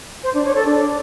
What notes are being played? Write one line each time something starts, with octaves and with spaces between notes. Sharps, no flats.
C5
D4
C#5
A4
D4